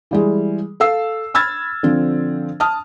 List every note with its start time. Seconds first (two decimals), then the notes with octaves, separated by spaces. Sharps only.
0.11 E3 G3 G#3
0.80 A4 F5 E6 C7
1.34 B5 E6 F6 G#6 A6
1.83 D3 F3 C4
2.60 A5 D#6 F6